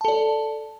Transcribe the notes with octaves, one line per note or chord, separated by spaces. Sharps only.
A4 D5 A5